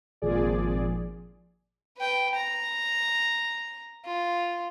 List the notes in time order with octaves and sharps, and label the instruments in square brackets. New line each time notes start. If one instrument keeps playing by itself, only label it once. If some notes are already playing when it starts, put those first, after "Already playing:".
[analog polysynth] G#1 A#2 F3 G#4 D5
[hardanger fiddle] B4 G5
A#5
F4